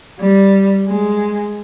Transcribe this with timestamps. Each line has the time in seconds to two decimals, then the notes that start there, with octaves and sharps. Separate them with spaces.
0.19 G3
0.88 G#3